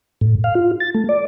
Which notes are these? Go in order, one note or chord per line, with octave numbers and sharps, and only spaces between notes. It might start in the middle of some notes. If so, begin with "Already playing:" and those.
A2
F5
F4
A6
A3
D5